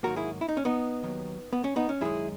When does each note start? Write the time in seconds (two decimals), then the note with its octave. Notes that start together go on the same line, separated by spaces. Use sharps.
0.03 G#2 D#3 F#3 A#3 F#4 A#4
0.16 E4 G#4
0.41 E4
0.48 D#4
0.57 C#4
0.65 B3 D#4
1.03 D#2 D#3 F#3
1.53 B3
1.64 C#4
1.76 B3 D#4
1.89 C#4
2.01 F#2 D#3 G#3 E4 G#4